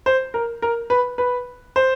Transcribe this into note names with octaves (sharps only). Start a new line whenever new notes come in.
C5
A#4
A#4
B4
B4
C5